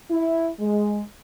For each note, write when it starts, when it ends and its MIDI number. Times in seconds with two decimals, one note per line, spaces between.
0.11 0.48 64
0.60 1.01 56